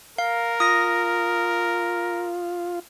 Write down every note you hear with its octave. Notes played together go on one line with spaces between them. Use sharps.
A#4 F5
F4 D#6 A#6